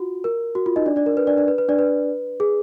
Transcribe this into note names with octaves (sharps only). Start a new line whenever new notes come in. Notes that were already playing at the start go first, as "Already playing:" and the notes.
Already playing: F4 F#4
A#4
F#4
F4
D#4 D#5
D4 D5
D4 D5
A#4
B4
D4 D5
D4 D5
B4
B4
D4 D5
B4
G#4